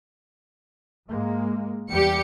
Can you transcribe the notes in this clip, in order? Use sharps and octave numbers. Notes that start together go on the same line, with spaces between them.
G#2 G#3 A#3
E2 G3 G4 C#7